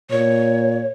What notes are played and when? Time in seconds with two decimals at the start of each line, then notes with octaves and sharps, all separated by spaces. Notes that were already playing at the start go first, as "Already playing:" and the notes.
0.11 A#2 C#5